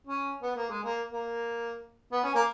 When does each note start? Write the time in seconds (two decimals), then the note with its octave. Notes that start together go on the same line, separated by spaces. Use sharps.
0.07 C#4
0.42 B3
0.55 A#3
0.69 G#3
0.83 A#3
1.10 A#3
2.12 B3
2.23 C#4
2.35 A#3